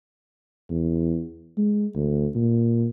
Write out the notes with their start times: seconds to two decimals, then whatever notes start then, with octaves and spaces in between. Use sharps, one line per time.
0.70 E2
1.57 G#3
1.95 D2
2.35 A#2